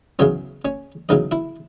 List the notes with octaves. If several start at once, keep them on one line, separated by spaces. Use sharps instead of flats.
E2 C#3 F#3 C#4 C#5
C#4 C#5
E2 C#3 F#3 D#4 D#5
E4 E5